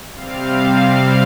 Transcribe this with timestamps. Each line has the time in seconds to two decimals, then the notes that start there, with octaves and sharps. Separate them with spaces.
0.14 C3 G3 C4 F5